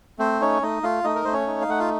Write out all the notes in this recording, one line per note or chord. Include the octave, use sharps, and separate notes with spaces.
A3 C4 C5
C#4 D#4 C#5
A3 D#4 D#5
A3 F4 F5
A3 D#4 D#5
A#4
A3 C5
C#4 C#5
D#4
F5
A3 F#5
F4 F5